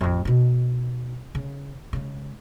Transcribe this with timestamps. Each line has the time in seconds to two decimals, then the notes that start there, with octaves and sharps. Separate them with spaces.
0.01 A1 F2
0.25 B2 D#4
1.35 C#3
1.93 C#3 G#3